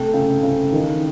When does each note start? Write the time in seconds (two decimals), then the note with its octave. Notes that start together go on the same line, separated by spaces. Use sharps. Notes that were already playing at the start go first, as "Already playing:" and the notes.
Already playing: C3 A3 G5
0.14 C#3
0.43 C#3
0.72 D#3